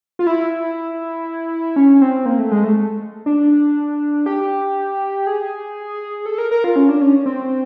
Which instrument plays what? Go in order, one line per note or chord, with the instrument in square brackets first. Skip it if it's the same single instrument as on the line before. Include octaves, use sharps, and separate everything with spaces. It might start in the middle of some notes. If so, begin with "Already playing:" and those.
[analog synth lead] F4
E4
C#4
C4
A#3
A3
G#3
A3
D4
G4
G#4
A4
A#4
A#4
F4
C#4
D4
C#4
C4